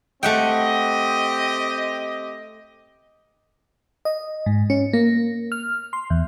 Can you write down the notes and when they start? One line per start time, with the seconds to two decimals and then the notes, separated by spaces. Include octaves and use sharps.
0.23 A3 C4 G4 D#5 F#5 G5
4.05 D#5
4.46 G#2
4.70 C#4
4.93 A#3
5.52 F6
5.93 C6
6.10 E2